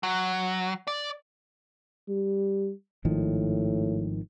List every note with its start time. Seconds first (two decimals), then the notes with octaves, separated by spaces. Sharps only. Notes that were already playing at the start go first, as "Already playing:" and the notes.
0.03 F#3
0.87 D5
2.08 G3
3.05 G#1 A2 D#3 F3